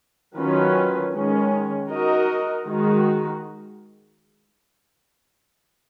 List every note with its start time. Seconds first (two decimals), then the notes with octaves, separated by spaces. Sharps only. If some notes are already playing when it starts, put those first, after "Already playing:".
0.36 D#3 F#3 C#4 F4 B4
1.13 D#3 G#3 C#4
1.90 D#4 F#4 A#4 D#5
2.66 D#3 G#3 D#4 F#4